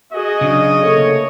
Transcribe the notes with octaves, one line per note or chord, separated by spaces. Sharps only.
F#4 G#4 D#5
C#3 F#3 D4
A3 A#3 A4 C#5